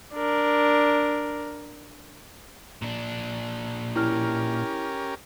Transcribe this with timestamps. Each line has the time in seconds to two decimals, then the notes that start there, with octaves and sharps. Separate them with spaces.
0.14 D4 A#4
2.82 A#2 D4
3.96 C#4 E4 G4 A#4 F6